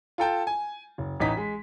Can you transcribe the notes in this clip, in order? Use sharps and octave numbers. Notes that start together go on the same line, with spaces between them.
F4 A4 G5 A5
G#5
F#1
A1 E3 D#4 B6
G#3